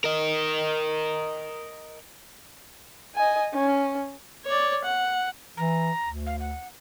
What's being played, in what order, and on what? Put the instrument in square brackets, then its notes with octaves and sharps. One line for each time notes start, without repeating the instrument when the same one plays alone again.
[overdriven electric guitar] A#4 D#5
[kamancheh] D#5 G#5
C#4
[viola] C#5 D5
F#5
[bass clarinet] E3 [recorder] A#5
[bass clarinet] D2
[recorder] F5
F#5